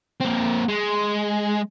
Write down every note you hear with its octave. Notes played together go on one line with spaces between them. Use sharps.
A#3 C4
G#3